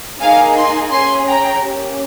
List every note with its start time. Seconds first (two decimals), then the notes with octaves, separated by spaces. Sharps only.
0.21 A#3 D#4 G#4 F5 G#5
0.56 G#5 C6
0.92 C#4 G#4 G#5 C6
1.28 G5 A#5
1.64 A#3 C#4 G4